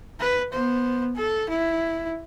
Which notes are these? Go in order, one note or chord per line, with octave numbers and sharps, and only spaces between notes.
B4
B3 C5
A4
E4